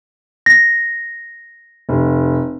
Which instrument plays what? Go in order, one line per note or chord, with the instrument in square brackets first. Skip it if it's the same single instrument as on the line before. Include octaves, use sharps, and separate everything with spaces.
[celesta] A#6
[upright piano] F1